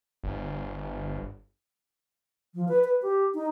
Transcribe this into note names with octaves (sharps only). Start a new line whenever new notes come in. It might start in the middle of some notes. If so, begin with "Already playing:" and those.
G1
F3
B4
B4
G4
D#4